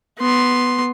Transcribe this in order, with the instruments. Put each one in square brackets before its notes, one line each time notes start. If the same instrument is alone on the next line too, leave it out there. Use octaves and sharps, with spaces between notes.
[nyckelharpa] B3 C6